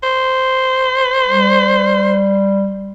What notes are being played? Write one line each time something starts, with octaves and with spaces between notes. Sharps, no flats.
C5
G3